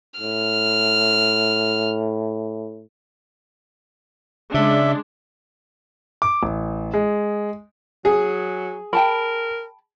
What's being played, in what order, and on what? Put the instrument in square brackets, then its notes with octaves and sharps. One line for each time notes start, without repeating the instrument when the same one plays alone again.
[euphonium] A2 [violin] F6
[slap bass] C#3 [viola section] G#3 D4 [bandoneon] E5
[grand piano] D6
A1
G#3
[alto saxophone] F#3 [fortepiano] G#4
[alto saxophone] A#4 [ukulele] G5 A5 B5